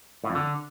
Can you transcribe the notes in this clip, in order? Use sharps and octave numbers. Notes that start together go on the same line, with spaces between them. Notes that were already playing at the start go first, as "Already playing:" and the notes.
A2
F2
D3